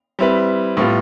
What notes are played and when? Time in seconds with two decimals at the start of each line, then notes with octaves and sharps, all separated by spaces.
0.19 G3 C4 E4 B4
0.77 A2 G3 B3 F4